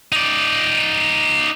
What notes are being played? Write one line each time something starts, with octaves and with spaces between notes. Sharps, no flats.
D#4 D5